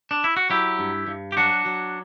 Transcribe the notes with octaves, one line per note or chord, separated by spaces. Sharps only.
D4
E4
F#4
F#3 E4 G4
G2
G2
G4
F#3 D4 F#4
F#3